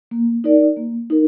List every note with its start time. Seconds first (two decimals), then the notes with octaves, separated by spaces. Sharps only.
0.11 A#3
0.44 D#4 A#4 D5
0.77 A#3
1.10 D#4 A#4